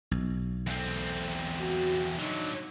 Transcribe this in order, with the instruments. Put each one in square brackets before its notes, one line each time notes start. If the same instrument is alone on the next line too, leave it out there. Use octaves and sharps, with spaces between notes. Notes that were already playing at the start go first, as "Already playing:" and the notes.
[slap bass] B1
[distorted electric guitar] E2 C4 [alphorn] A3
[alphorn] F#4
[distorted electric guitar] D3 F#3 [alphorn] D#4